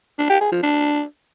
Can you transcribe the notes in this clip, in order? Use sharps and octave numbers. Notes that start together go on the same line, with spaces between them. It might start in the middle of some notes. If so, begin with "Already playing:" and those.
D4
G4
G#4
F3
D4